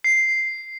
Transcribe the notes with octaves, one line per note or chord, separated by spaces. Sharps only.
C7